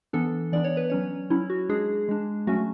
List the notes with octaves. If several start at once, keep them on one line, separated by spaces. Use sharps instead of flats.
E3 B3 D4 A4
E3 B3 D4 D5
C#5
B4
F#3 C#4 C#5
F#3 C#4 E4
F#4
G#3 D4 G#4
G#3 D4
F#3 A3 C#4 F#4